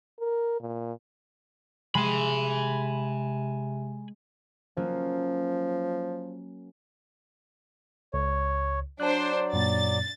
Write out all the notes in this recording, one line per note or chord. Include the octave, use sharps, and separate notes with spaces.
A#4
A#2
C3 G#3 G#5 B5
F3 F#3 A#3 C#4
C#2 C#5
F#3 D4 C5 D5 A5 F#6
F#2 A#2 A6